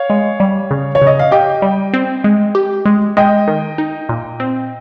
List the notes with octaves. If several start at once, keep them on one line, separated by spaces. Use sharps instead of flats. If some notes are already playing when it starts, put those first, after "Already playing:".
Already playing: C#5 F5
G#3
G3
C#3
C#5
C#3
D#5
F5
G4 D#5 G5
G3
C4
G#3
G4
G#3
G#3 D#5 G5
D#3
D#4
A#2
C4